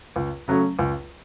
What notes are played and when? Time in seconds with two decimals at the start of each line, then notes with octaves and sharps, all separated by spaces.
0.16 C#2
0.48 C#3 F#3 A3 C#4
0.79 C#2